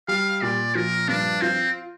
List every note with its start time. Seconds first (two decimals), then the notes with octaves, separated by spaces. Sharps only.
0.08 G3 F5
0.42 A#2 D5
0.75 F3 A#4
1.08 G2 D4
1.42 C4 F4